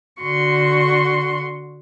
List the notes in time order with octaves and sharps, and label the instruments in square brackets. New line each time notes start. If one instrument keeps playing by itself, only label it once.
[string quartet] D3 F#4 C6 C#6